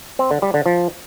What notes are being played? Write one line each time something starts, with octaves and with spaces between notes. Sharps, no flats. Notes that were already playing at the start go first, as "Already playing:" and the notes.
C4
D3
G3
D3
F3